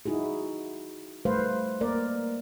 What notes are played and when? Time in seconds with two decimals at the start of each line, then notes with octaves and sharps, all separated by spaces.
0.06 D#4 E4 F#4 G#4
1.25 G3 A3 B4 C5 F5
1.81 A#3 A#4 D5